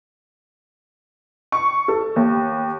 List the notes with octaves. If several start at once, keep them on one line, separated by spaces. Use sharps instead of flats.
C#6
A4
D#2